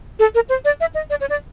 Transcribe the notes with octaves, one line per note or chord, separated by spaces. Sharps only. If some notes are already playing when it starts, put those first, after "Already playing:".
A4
A#4
C5
D5
E5
D#5
D5
C#5
D5